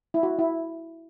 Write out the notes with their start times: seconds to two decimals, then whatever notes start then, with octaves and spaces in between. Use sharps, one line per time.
0.14 E4
0.23 F#4
0.39 E4